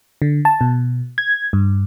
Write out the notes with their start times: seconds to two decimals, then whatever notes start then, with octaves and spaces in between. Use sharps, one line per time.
0.22 D3
0.45 A5
0.61 B2
1.18 G#6
1.53 G2